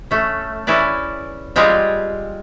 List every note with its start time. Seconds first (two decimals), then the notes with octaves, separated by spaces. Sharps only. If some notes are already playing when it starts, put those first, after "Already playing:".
0.11 A3 C#4
0.67 C#4 E4 G#4 B4 D5
1.56 G3 G#3 C4 F4 G4 G#4